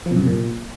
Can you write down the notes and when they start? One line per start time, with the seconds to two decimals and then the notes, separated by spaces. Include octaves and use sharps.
0.06 F3
0.11 B2
0.16 F#2
0.22 C3
0.27 A#2